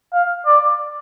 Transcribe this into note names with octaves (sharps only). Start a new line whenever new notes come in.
F5
D5